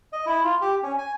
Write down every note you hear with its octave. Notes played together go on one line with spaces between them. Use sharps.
D#5
E4
F4
G4
C#4
G#5